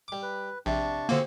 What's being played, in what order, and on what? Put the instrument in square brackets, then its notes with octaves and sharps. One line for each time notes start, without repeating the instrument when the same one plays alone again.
[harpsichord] G3 D6
[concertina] B4
[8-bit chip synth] A#1 [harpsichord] C3 [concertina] D4 A5 C#6
[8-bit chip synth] D3 A#3 [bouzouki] C4 F#4 G#4 [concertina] F4